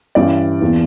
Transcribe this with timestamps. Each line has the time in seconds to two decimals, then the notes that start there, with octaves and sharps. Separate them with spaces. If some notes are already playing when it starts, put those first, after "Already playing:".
0.15 G2 E3 G3 C#4 E4 D5
0.61 E2 E3 A#3